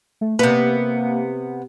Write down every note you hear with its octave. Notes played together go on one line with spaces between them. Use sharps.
A3
C3 A#3 B3